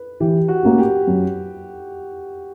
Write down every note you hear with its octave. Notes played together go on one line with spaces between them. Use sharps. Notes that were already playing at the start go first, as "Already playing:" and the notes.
Already playing: B4
E3 G4
F#4
A#3 C#4 F#4
G4
F#2